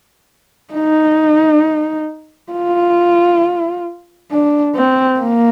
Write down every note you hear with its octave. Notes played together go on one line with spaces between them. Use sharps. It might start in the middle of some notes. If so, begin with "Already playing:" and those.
D#4
F4
D4
C4
A#3